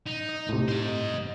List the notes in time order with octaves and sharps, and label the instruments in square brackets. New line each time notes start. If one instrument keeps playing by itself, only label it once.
[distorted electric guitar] D#4
[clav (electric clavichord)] D#5
A2 C3
[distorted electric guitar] C5 D#5